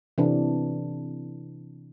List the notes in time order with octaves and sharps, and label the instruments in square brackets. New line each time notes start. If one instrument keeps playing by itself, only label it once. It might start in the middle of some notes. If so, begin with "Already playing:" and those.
[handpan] C3 E3 D4